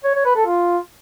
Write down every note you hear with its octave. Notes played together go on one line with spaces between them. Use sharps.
C#5
C#5
B4
A4
F4